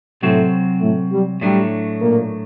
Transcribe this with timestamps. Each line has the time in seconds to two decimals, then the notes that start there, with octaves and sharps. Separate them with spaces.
0.22 A2 C3 F#3 A3 C4 F#4
0.82 A2 A3
1.12 G3
1.41 A2 F#3 G3 A3 D4
2.01 A#2 A#3